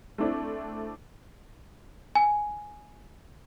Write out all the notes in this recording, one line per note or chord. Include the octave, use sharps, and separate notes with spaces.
A3 C4 D4 E4
G#5